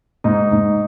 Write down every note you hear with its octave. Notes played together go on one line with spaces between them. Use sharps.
G#2 D#4
G#2